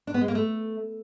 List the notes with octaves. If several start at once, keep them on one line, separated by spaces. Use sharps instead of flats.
D4
B3
G#3
A#3
A3